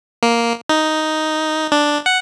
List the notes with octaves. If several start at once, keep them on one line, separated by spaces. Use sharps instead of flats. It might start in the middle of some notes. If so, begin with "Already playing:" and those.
A#3
D#4
D4
F#5